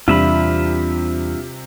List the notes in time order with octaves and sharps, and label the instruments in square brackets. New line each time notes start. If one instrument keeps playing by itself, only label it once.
[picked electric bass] E2 [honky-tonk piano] C3 [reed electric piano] G3 D4 [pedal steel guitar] F4 E5 B5